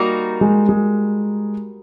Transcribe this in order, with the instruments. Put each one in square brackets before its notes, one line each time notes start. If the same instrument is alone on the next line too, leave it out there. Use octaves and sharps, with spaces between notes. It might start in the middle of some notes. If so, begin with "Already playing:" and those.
Already playing: [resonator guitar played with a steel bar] G3 A#3 D#4 F#4 A#4
[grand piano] G#3
G#3